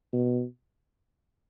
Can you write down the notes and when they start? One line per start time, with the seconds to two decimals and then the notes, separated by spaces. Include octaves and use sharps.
0.13 B2